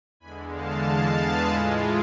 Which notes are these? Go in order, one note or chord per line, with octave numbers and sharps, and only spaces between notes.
E2 D3 G#3 G#5 B5
F5 A5
F5 A5
G#4 B4
A2 E3 G#3 F4 A4